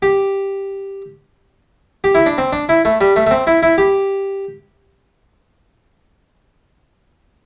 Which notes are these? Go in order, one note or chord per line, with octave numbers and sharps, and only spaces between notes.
G4
G4
E4
D4
C4
D4
E4
A3
G3
A3
A3
C4
E4
E4
G4